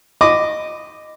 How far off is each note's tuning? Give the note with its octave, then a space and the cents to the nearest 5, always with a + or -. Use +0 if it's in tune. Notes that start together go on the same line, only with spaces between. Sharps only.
D#5 -10 B5 +30 D6 +0